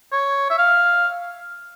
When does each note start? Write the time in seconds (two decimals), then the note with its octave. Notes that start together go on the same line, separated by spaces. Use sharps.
0.12 C#5
0.50 E5
0.58 F5